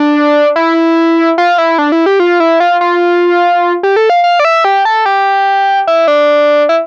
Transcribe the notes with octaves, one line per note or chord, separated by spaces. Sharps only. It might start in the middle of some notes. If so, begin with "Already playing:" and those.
Already playing: D4
E4
F4
E4
D4
E4
G4
F4
E4
F4
F4
G4
A4
F5
F5
D5
E5
G4
A4
G4
E4
D4
E4